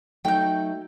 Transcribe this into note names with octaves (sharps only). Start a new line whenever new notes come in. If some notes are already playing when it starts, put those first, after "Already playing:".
F#3 A3 D#4 G5 G6